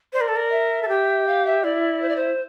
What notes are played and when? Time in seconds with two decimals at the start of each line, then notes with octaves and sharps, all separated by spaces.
0.13 C5 D5
0.21 A#4
0.28 A4
0.36 A#4
0.50 E5
0.83 A4
0.88 G4
1.26 F5
1.45 E5
1.63 E4 D5
2.01 C5
2.08 D5
2.15 C5